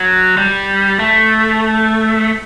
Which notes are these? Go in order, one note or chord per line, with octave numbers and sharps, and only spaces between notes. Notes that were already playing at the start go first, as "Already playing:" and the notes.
Already playing: F#3
G3
A3